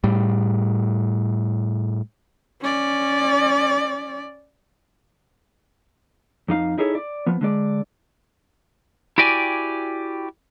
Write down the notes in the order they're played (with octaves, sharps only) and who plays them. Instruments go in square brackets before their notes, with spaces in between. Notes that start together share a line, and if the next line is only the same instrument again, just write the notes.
[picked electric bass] A2 G3
[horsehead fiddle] C#4 D5
[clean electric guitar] F2 D#4 F5
D#4 E4 G#4 A4 C#5
D5
F3 B3
D3 G#3 D5
E4 F#4 G4 D5 G5 G#5